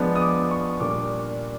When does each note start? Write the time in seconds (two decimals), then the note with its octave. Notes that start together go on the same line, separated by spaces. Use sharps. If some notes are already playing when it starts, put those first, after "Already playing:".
Already playing: F3 G#3 B3 D4
0.16 D#6
0.22 D6
0.51 C#6
0.80 A#2 G3 A#3 D4 D6